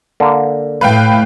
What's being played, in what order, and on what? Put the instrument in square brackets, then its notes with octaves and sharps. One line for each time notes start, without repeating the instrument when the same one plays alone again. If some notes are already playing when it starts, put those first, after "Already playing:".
[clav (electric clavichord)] D3 A#3
[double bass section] A2 A3 [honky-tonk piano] B4 F5 G5